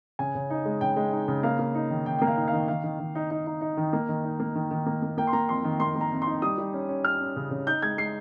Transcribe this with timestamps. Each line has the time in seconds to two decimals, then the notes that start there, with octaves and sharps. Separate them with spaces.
0.19 C#3 G#5
0.35 C#3
0.50 D#4
0.65 G#3
0.81 C#3 G5
0.97 G#3
1.13 D#4
1.28 C#3
1.43 A#3 F5
1.59 A#3
1.75 D#4
1.90 D#3
2.06 D#3 G5
2.18 A#3 G5
2.27 F5
2.37 D#4
2.48 F5
2.53 D#3
2.68 D#3 F5
2.84 D#3
2.99 D#3
3.15 D#4
3.31 D#4
3.46 D#4
3.61 D#4
3.77 D#3
3.93 A#3
4.09 D#3
4.24 D#4
4.40 A#3
4.55 D#3
4.71 D#3
4.86 A#3
5.02 A#3
5.18 A#3 G5
5.27 C6
5.33 A#3 A#5
5.49 F2 C6
5.65 D#3
5.80 A#3 C6
5.96 A#3
6.01 A#5
6.11 F2
6.22 D#4 C6
6.42 G3 D#6
6.58 G3
6.74 C#4
6.89 C#4
7.05 C#4 F6
7.20 C#4
7.36 C#3
7.51 C#3
7.67 D#4 G6
7.82 G#3 G#6
7.98 G#3 C7